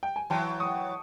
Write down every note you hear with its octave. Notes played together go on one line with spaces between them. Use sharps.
G5
G#5
E3 F#3 G5 A5
C#6 D#6